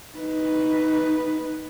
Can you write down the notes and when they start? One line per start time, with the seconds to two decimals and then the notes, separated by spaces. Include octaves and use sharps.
0.18 D#4 B4